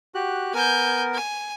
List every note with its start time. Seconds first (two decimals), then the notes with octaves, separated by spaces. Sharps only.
0.15 F#4 G4 F#6
0.54 B3 A#4 G#5 G6
1.14 G#5